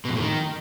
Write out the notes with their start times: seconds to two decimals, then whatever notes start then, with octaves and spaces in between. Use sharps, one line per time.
0.05 B2
0.10 F2
0.15 A2
0.20 D#3